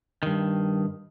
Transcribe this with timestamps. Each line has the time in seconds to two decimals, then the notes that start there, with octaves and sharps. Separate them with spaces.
0.23 G2 D#3